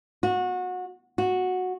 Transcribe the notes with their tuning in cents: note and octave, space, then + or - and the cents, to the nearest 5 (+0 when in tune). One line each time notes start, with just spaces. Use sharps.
F#4 -25
F#4 -10